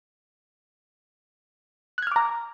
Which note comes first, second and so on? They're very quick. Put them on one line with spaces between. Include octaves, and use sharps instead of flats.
F#6 G#6 F6 D6 A#5